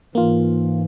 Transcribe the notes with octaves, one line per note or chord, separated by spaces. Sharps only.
G#2 E3 A#3 F4